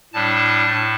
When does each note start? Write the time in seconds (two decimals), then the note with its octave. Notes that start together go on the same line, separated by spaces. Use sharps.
0.13 A2 G3 D4 A5
0.67 A2 A5